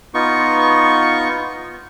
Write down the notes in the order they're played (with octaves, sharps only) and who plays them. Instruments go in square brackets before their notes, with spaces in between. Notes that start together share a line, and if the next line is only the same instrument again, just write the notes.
[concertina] B3 D#4 F4 C#6